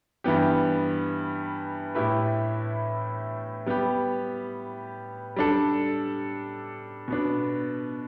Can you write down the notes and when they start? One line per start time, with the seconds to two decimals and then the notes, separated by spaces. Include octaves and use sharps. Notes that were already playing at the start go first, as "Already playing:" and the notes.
0.24 G2 E3 G3 B3 G4
1.95 A2 A3 E4 G4 B4
3.66 G3 B3 G4
5.36 G3 D4 A4
7.08 B2 B3 D4